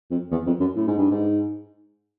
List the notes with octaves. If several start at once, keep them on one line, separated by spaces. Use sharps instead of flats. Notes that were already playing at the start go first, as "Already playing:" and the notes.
F2
E2
F2
F#2
A2
G#2
G2
G#2